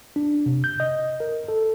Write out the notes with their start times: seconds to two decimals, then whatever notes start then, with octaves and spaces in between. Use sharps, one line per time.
0.16 D4
0.46 C3
0.64 G6
0.80 D#5
1.20 A#4
1.48 A4